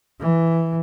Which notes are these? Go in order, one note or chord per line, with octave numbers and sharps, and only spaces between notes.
E3